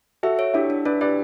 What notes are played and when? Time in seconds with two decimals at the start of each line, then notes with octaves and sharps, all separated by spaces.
0.23 F#4 A4 E5
0.39 C#5
0.54 D4 E4 G4
0.70 D4
0.85 D4 B4 D5
1.01 G4 B4 D5